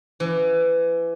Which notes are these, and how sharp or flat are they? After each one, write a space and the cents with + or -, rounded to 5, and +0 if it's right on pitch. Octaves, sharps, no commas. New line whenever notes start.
E3 +25